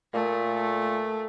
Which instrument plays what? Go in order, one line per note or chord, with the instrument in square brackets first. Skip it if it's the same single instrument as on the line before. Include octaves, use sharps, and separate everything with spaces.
[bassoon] A#2 [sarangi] A3